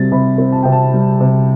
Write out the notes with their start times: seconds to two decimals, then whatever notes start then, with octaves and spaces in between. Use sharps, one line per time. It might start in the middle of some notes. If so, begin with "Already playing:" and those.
Already playing: C3 G3 C4 A6
0.12 C3 B5
0.38 C4
0.52 A5
0.63 C3 G5
0.72 A5
0.94 G3
1.20 C3